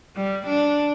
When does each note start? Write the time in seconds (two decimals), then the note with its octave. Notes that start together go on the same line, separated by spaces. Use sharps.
0.16 G3
0.46 D4